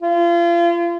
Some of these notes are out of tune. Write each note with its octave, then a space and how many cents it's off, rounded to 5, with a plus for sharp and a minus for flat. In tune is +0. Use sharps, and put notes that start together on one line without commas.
F4 -35